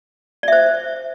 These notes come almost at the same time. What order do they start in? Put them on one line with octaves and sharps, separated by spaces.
D5 E5 C5